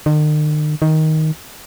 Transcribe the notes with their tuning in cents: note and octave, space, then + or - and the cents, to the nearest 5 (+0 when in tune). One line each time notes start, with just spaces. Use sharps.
D#3 -45
D#3 +10